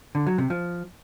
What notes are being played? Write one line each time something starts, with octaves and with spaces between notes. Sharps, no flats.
D3
F#3
C3
F3